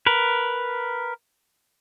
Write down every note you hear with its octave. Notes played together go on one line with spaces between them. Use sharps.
A#4 B4